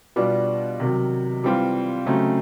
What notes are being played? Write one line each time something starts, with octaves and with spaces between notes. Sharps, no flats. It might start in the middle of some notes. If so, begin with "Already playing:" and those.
B2 G3 B3 D4 F4
C3 D#3 F#3
E3 G3 C4 F4
C#3 F#3 A3 C4 D#4